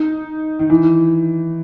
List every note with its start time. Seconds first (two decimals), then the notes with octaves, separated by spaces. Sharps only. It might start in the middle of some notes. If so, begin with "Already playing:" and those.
Already playing: D#4
0.59 D#3
0.70 E3